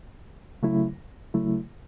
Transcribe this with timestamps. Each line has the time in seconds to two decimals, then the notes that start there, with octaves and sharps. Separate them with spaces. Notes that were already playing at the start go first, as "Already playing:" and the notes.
0.63 C#3 F#3 A3 E4
1.34 C#3 F#3 A3 E4